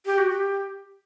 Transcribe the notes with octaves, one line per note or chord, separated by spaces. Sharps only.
G4
F#4
G4